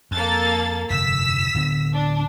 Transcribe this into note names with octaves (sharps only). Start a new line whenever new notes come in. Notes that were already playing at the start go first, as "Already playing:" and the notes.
F2 A#3 A4 A6
F1 G2 D3 E6 B6
D1 D3 B3
D4